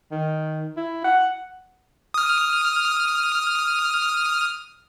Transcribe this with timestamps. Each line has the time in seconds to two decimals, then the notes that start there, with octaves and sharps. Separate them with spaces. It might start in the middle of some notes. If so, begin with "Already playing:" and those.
0.11 D#3
0.77 E4
1.04 F#5
2.14 D#6 F6